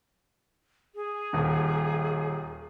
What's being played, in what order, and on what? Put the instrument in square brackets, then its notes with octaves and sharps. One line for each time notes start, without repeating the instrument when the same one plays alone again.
[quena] G#4
[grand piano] D#1 D#2